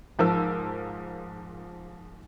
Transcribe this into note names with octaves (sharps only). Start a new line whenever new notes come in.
G#2 F3 A#4 A5 E6